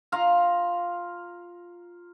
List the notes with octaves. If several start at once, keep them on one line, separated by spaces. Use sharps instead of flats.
F4 F5 A#5